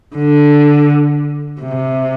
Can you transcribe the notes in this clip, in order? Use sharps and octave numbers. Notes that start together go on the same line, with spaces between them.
D3
C3